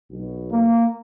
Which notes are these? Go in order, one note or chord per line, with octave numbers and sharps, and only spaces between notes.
B1 B2
A#3